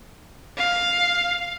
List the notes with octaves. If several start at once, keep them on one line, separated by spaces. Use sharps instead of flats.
F5